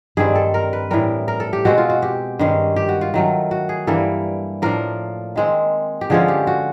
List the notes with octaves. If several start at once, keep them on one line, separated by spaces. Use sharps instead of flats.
G2 D#3 G3 C4 G#4
A4
A#4
B4
A2 E3 G3 A#4
A#4
A4
G4
B2 G#3 C4 F#4
F4
F#4
G4
G2 D#3 G#3 C#4
G4
F#4
F4
D#3 F#3 A3
F#4
G#4
G2 E3 G3 A#3 A4
A2 F3 A#3 D4 A#4
D#3 G#3 C4
G4
D3 F3 G#3 C#4 G#4
G4
F#4